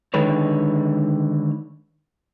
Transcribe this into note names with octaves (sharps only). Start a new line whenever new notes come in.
D3 D#3 G#3 B4 C#5